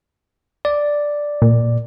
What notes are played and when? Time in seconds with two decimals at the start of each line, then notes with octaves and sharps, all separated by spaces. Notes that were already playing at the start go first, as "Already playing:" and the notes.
0.65 D5
1.42 A#2